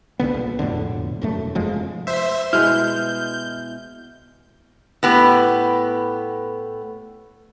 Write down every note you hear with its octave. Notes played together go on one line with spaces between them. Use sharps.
C#2 F#2 D3 B3
A#1
E1 F2 A2 D3
E1 F#2 A3
F1 F3 G#3
C5 E5
B2 G#3 E4 F6 G6
A2 B3 G4